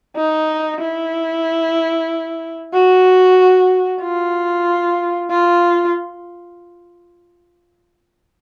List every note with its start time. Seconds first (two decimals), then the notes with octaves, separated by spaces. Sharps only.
0.16 D#4
0.81 E4
2.73 F#4
4.02 F4
5.30 F4